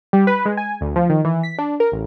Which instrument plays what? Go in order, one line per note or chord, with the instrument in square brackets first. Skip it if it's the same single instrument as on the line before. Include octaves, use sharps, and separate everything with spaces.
[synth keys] G3
B4
G#3
G#5
D2
F3
D#3
E3
B6
D4
A#4
A1